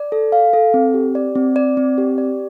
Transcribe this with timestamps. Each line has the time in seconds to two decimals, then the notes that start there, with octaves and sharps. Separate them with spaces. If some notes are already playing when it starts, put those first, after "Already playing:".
Already playing: D5
0.12 A4
0.32 F5
0.53 A4
0.74 C4
0.94 G4
1.15 D5
1.35 C4
1.56 D5
1.77 C4
1.98 G4
2.18 D5